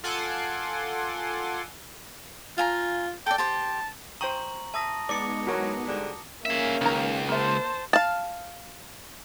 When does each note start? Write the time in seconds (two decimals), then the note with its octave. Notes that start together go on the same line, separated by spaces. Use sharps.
0.04 F4 A4 F#5 G#5 C6 D6
2.58 F4 F5 G#5 A#5
3.26 A4 D5 G5
3.38 G4 C5 G5 A5
4.21 C5 G5 A#5 C#6 D#6 F#7
4.74 E5 A5 D#6 A#6
5.09 G#3 B3 D#4 D5 D6 C#7
5.47 E3 F#3 F#4 A#4
5.86 G#2 D3 G3
6.46 A#3 C#4 G#4 E5
6.81 C#2 D#3 A#5
7.29 A#3 C5 E5 A5
7.93 F5 A5